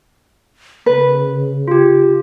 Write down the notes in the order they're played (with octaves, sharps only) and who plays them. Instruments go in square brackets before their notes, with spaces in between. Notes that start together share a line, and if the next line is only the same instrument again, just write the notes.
[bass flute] C#3 [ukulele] B4
[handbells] F4 G4